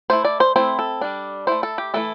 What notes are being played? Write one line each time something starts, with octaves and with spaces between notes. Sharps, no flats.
A3 E4 C5
D5
C5
A3 C4 E4 C5
A4
G3 D4
A3 E4 C5
A4
G4
E3 A3 E4 A4